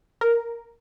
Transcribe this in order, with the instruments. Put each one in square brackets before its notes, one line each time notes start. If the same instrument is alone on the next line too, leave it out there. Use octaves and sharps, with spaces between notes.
[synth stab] A#4